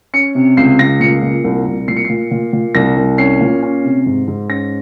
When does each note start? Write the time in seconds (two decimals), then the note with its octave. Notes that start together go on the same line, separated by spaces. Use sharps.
0.13 C#4 C#7
0.35 C3
0.57 C#2 C7
0.79 C#2 A#6
1.00 A#2 C#7
1.23 A#2
1.44 C2
1.66 C2
1.88 A#2 C7
1.97 C#7
2.05 A#2 C7
2.31 A#2
2.53 A#2
2.75 C2 A#6
2.96 C2
3.18 C#4 C7
3.40 A#2
3.63 C#4
3.84 C3
4.06 G#2
4.28 G#2
4.49 C#4 A#6